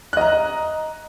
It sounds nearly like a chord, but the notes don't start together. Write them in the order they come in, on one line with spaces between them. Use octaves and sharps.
F#6 D#5 A#5